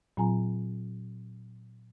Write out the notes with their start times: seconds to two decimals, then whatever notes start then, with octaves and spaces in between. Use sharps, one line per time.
0.17 A#2 F#3 C4 F4 G#5 A#5